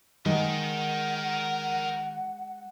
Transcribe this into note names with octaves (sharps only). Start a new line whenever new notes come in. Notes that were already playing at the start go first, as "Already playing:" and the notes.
D#3 G#3 A#4 F#5 G5